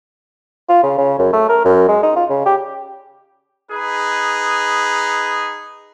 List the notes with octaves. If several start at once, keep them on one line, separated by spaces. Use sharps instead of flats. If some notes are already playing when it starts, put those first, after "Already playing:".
F4
C#3
C#3
F#2
A3
A#4
F#2
G#3
D#4
F4
C#3
G4
D#4 G#4 B4